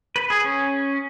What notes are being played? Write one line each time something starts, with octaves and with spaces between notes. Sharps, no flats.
B4
G#4
C#4